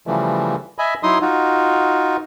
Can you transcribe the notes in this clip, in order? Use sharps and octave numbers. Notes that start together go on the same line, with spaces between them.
C#3 E3 F3 G3 A3
D#5 E5 G#5 B5
F#3 D#4 E4 C6 D#6
D#4 F4 F#4